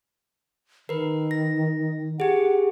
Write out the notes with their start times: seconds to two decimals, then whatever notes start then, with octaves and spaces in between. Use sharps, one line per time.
0.89 D#3 A#4 B4
1.31 A#6
2.20 G4 G#4 F#5